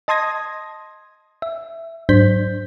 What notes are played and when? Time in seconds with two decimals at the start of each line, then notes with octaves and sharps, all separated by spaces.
0.08 D#5 A5 C6 D#6 G#6 A#6
1.42 E5
2.09 G#2 F#3 D4 C5 G6 B6